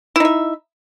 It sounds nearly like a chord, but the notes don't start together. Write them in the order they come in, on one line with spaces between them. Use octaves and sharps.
E4 D#4 E5